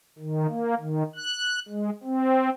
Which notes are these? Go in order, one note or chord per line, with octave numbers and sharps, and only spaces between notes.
D#3
A#3
D#3
F#6
G#3
C4